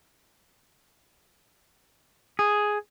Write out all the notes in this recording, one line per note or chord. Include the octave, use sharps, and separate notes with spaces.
G#4